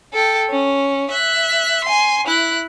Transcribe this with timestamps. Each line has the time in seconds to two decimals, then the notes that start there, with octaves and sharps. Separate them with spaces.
0.13 A4 G5
0.50 C#4
1.11 E5 F#6
1.84 G#5 C6
2.27 E4 F#6